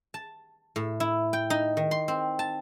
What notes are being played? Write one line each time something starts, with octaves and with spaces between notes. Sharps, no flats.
A5
A2
E4
G5
D#4
D#3
C6
C4
A5